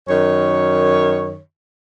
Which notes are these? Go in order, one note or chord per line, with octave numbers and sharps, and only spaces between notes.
F#2 D#3 C#5